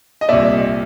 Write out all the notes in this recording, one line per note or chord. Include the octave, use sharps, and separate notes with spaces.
D#5
C2 A#2 D5 E5